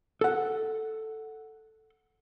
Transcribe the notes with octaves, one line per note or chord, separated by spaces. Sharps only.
A4 F#5